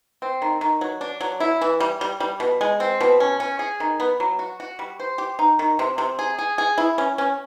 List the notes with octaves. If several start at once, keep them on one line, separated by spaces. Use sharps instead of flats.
C4
D#3
D#3
F#3
D4
F#3
E4
E3
G3
G3
G3
B2
G#3
C4
B2
C#4
C#4
G#4
D#3
B3
F#3
F#4
F#4
G3
C5
G4
D#4
D#3
C3
C3
G#4
G#4
G#4
E4
C#4
C#4